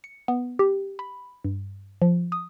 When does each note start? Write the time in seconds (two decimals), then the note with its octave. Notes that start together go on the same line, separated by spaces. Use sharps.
0.04 C#7
0.28 B3
0.59 G4
0.99 B5
1.44 G2
2.02 F3
2.32 D#6